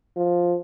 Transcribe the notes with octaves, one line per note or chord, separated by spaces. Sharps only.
F3